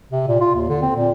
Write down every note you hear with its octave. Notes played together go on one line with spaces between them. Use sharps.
C3
A#2
F4
D#2
D3
C4
A#2